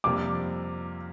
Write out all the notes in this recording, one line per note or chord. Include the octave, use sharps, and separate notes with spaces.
F2 C3 G3 A#3 D4 D6